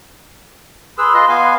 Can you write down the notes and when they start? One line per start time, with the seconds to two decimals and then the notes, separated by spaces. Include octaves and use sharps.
0.98 G#4 B4 C6 E6
1.14 F4 B4 D#5
1.29 B3 F5 G#5